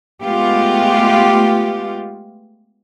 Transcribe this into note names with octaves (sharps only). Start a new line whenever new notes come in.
G#3 A3 B3 F4 G4